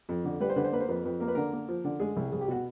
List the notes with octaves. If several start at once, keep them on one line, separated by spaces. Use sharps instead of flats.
F2
D3
G3 B4
C5
D3 B4
C5
A#3 B4
C5
F2 B4
F2 B4
A#3 A#4
B4
D3 A#4
A#3
F3
D3
G#3 G#4
C2
C2 G#4
G4
B2 F#4